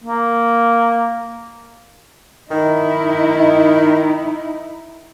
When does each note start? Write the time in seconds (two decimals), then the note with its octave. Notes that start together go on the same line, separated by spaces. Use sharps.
0.04 A#3
2.51 D#3 D#4 E4